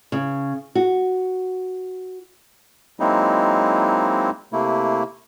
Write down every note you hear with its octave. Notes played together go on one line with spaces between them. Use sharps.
C#3
F#4
F#3 G#3 A#3 C4 D#4 E4
C3 A3 A#3 E4